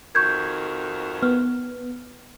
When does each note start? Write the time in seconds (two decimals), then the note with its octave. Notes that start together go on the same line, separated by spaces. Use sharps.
0.15 F2 D#3 F#4 C#6 G6 G#6
1.23 B3 F6